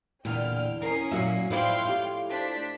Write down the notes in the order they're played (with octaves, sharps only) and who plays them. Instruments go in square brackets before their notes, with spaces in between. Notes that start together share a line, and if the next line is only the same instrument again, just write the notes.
[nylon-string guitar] E2 [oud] A#2 D3 [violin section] G5 F6
[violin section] C#4 D#6 C7 [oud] A#4
[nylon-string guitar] F#2 F#3 A#3 [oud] A#2 F#4 E5
[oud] A2 E4 D5 [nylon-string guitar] F3 B4 [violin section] F5 G5 C6
[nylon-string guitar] F4 G4
[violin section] D4 C5 B6